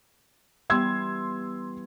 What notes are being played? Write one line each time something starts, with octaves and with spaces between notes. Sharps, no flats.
E3 G3 B3 C6 E6 G#6